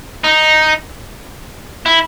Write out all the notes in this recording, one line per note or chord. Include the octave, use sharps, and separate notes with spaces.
D#4
E4